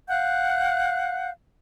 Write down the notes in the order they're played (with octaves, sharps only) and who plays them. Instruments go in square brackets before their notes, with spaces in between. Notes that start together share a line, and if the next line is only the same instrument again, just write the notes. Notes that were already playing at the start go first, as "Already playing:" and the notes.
[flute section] F5 F#5 F#6 G6